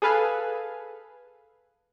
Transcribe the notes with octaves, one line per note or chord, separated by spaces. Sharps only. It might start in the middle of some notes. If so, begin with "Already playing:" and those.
G#4 A4 B4 F5 G#5